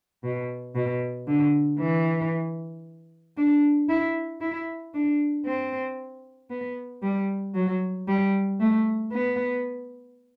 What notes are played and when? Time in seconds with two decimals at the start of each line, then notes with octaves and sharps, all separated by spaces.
0.24 B2
0.75 B2
1.27 D3
1.79 E3
3.37 D4
3.89 E4
4.41 E4
4.94 D4
5.45 C4
6.50 B3
7.03 G3
7.55 F#3
8.08 G3
8.60 A3
9.12 B3